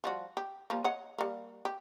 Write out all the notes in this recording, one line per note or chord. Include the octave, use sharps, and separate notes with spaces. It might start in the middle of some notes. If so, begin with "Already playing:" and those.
F3 G3 F#4
G4
F3 G3 A#3
C#5 D#5 F#5
G3 A#3
G4